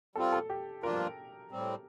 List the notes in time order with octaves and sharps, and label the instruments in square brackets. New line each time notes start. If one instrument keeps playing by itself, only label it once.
[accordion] G3 C4 F4 [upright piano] A4
[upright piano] A4
G4
[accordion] G2 F3 A#3 D4 F4 [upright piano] A#4
[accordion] A2 G3 C4